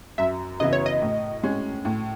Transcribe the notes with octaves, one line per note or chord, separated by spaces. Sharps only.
F#2 E5
C#3 E3 B3 E4 D#5
C#5
D#5
A2
G#3 C#4
A2